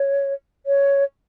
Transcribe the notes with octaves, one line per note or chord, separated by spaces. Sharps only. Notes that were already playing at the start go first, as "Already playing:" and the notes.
Already playing: C#5
C#5